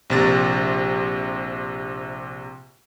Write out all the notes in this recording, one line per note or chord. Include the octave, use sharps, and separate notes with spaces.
A#1 C3 A6